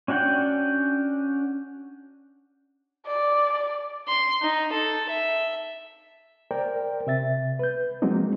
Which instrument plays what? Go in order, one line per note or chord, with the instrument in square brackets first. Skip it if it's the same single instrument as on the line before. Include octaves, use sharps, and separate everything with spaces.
[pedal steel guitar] C#4 D4 F#4 F#5 G5
[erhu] D5
[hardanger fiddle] C6
D#4
A4
E5
[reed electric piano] A#4 C5 D5 G5
C3 E5 A6
B4 G6
F3 F#3 G#3 A#3 C4 D#4